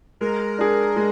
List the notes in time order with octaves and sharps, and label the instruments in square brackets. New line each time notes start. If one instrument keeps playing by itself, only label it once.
[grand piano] G#3 [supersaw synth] A#4
[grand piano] D4 G#4
G#3